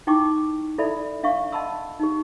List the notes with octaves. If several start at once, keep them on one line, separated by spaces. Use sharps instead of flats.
D#4 E4 G5 C#6 D6
E4 A4 D5 E5 B5
D4 E5 F5 C#6
D#5 F#5 A5 B5 C6 E6
D#4 G4